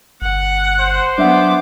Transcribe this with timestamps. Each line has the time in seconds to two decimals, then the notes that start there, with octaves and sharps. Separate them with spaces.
0.22 G1 F#5
0.80 C5
1.18 F#3 B3 D4 E5 F#5 D6